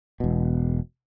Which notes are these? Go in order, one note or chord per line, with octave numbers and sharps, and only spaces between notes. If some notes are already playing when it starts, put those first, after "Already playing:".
E1 B2